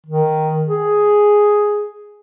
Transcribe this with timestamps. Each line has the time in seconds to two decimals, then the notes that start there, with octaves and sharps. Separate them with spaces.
0.06 D#3
0.66 G#4